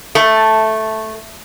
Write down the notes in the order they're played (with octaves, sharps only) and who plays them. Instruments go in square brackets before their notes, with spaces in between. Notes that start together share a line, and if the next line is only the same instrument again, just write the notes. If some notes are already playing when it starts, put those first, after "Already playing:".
[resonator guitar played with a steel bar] A3